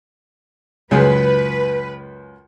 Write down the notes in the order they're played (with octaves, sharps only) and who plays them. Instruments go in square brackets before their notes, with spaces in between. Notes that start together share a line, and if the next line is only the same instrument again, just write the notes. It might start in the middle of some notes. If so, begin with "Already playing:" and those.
[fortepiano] C#2 F#2 G#4 [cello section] B4